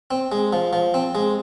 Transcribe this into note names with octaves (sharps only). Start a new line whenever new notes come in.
C4
G#3
F3
F3
C4
G#3